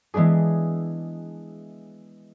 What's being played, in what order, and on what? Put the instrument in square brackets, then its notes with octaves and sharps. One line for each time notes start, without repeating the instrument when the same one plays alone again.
[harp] E3 G#3 B3 D4 G#4